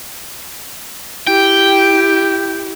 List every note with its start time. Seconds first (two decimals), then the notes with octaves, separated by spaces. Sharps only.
1.27 E4 G4 G5